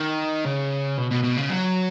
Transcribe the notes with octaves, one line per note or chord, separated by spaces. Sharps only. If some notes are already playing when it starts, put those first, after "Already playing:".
Already playing: D#3
C#3
B2
B2
B2
C#3
F#3